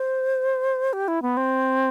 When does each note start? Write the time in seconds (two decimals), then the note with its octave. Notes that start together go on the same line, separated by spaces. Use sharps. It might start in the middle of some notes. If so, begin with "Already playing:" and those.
Already playing: C5
0.93 G4
1.08 E4
1.22 B3
1.37 C4